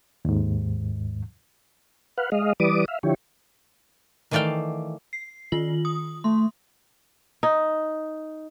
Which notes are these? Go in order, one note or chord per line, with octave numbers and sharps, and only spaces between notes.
D#2 G#2
B4 F5 F#5
G#3 D#5 F5
E3 G3 B4 D5 D6 D#6
E5 F5
D3 F3 E4 G4 C#5
D#3 E3 A3 D5 F5 G5
C7
D#3 F4 F#7
D#6
A3 C6
D#4